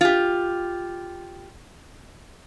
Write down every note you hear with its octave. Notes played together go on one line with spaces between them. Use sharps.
F4 G4